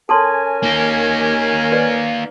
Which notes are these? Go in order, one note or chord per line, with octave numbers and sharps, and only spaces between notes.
C#4 A4 A#4 G#5 A5 C6
A#3 D#4
B4 D5